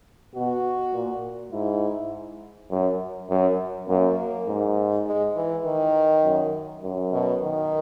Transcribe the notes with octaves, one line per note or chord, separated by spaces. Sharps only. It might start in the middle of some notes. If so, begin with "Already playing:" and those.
B2 F#4
A#2
G#2 E4
F#2
F#2
F#2 A#3
G#2
G#3
E3
D#3
F#2
F#2
B2
D#3